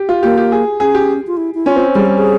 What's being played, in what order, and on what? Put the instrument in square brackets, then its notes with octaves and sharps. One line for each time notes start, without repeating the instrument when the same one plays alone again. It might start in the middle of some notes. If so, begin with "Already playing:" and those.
Already playing: [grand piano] G4
F4
[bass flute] A#3 [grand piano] G4
[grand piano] G4
G#4
[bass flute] C#4 [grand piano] G#4
[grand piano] G4
[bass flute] F4
E4
E4
[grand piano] C#4 [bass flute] F4
[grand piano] C4
[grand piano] G3 [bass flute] G#4
[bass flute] G4
G#4